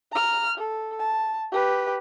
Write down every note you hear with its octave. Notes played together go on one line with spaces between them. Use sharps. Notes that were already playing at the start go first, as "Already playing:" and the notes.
A#5 F6
A4
A5
G4 B4